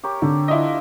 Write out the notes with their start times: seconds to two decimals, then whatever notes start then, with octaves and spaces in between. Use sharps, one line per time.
0.04 G4 A#4 C#5
0.22 D3
0.48 D4 E4 F4 D5 D#5